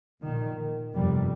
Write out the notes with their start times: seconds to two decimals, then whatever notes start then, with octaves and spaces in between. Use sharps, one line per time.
0.22 A#1 A#2 D#3
0.93 G1 F2 C3 G3